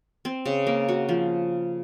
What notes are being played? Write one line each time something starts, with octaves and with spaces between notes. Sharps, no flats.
C4
C#3
A#3
F#4
F3